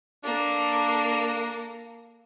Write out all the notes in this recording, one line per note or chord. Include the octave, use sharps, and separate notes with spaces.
A#3 D4 A4